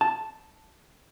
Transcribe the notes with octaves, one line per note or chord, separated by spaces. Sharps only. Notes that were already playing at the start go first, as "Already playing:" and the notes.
A5